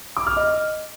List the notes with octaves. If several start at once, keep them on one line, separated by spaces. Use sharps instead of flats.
D6
F6
D#5